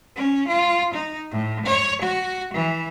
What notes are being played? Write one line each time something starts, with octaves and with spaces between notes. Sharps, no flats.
C#4
F4
D#4
A2
C#5
F#4
E3